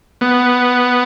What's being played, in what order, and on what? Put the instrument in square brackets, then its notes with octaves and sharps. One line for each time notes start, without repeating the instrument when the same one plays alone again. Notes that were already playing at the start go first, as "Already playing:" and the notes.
[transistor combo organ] B3